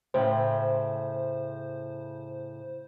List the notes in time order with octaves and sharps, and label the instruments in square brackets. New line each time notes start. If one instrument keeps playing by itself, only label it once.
[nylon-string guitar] A2 C#3 G5 [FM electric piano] C5